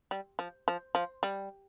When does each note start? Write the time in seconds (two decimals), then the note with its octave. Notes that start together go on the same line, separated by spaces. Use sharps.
0.11 G3
0.39 F3
0.68 F3
0.95 F3
1.23 G3